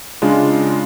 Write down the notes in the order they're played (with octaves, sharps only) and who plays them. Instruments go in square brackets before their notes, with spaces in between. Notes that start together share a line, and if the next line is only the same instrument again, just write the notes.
[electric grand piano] C#3 G#3 D4 F4